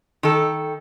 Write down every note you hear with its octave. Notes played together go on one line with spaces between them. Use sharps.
D#3 A4